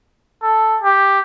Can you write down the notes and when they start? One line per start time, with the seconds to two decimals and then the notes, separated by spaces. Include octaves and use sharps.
0.43 A4
0.82 G4